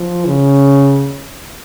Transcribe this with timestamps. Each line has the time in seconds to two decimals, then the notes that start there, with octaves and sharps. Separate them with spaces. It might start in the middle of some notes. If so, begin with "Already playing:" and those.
Already playing: F3
0.26 C#3